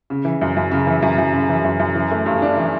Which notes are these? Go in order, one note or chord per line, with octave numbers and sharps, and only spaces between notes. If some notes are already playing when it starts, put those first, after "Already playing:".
C#3
E3
F#2
F#2
C#3
E3
F#2
F#2
C#3
E3
F#2
F#2
E3
A3
G2
D4
E3